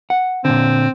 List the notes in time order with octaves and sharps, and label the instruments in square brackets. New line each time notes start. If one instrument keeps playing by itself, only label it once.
[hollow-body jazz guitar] F#5
[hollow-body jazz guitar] A#2 D3 [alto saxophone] C4